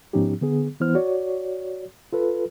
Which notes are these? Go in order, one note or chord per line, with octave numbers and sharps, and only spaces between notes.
G#2 F3 B3 C#4 D#4 G4
D3 B3 G#4
E3 B3 E4 C5 F6
F#4 C#5 D5
F4 A4 B4